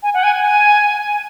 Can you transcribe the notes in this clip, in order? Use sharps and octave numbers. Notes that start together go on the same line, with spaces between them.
G#5
F#5
G#5
G#5